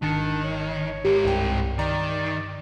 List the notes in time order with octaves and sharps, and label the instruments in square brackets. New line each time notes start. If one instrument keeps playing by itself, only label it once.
[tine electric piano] G#1 A5 C#7 [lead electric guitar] D#3 [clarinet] D4
[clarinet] C#5
[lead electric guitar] G#2 A#4 [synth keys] G4
[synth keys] C2 G5 [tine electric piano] G2
[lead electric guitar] D#3 [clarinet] D5 [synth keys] A#5